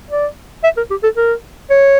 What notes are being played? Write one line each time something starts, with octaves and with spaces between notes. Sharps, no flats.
D5
E5
A#4
G4
A4
A#4
C#5